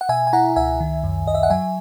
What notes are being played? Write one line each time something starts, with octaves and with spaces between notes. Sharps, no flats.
F#5
B2 E5 G#5
G#5
E4 F#5 A#5
C#2 E5 G#5
D#3
F#2
F#2 D#5
E5
F#5
F#3 E5 G#5